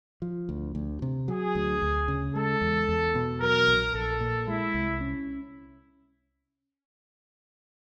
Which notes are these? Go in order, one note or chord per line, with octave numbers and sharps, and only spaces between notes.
F3
D2
D2
C3
F#3 G#4
D2
D2
C#3
G#3 A4
E2
E2
B2
F#3 A#4
A#1
A#1 A4
A#2
G#3 E4
C2
C#4